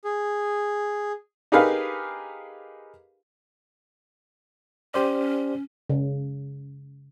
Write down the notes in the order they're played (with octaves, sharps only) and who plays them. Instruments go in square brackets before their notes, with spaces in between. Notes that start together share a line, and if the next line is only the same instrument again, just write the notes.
[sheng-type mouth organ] G#4
[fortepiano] D#4 G4 G#4 A#4 B4 F5
[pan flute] C#4 [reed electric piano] G4 C5 D5
[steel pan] C#3